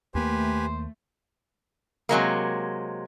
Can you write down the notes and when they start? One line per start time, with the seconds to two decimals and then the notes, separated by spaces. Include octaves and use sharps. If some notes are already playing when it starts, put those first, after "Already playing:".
0.15 D#2 A3 A#3 G4 B4 C5 G#5
2.09 C3 F#3 G#3 A#3